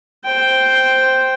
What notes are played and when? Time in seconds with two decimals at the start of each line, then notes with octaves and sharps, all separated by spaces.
0.25 C5 G5